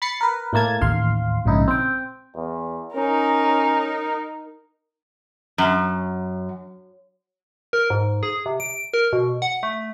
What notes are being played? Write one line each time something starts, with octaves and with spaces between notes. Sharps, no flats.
B5 A6 C7 C#7
A#4 B4
A2 A3 A#3 A5 G#6
A1 D#2 F5 C6
A#1 G#2 C#3 D#4 E4
C4 G5
E2
C#4 D#4 A#4
F#2
A#4
G#2
G#4
C3
D7
A#4
B2
F#5
A3